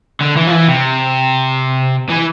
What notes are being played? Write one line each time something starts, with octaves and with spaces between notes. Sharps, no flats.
D3
E3
F3
E3
C3
E3